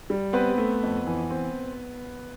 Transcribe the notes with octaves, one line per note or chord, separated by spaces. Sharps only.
G3
B3 C4 B4
A3
F2
E3
C4